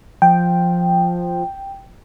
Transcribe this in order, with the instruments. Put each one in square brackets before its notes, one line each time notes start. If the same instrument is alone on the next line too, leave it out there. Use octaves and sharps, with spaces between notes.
[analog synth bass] F3 [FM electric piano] G5